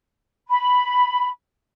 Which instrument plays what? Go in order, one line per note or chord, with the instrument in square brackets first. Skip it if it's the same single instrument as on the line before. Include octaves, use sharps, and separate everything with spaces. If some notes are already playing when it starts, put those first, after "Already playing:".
[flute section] B5